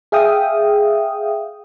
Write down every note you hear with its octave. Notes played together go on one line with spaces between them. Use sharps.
G#4 E5 F5 G5 D#6